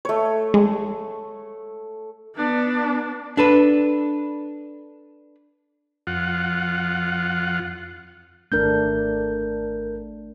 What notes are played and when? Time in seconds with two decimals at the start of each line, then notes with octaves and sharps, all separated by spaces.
0.05 A3 C#5
0.54 G#3
2.35 B3 D4
3.37 D4 A4 B4
6.07 F2 F4 F#5
8.52 G#1 A3 D4 A#4 G6